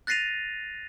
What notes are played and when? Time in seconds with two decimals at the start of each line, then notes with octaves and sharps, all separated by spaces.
0.07 F#6 A6 A#6 C7 D#7 F7